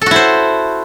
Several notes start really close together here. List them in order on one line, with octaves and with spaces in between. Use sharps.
A4 F#4 E4 C5